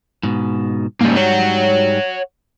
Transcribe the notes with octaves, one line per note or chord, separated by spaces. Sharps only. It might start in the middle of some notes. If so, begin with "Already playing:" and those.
G#2 B2
G#2 C#3 G3 A#3
C#5 F#5